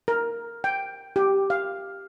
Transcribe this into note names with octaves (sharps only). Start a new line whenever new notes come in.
A#4
G5
G4
F5